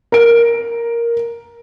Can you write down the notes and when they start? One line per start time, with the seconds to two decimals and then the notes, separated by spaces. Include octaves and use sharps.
0.12 A#4 D7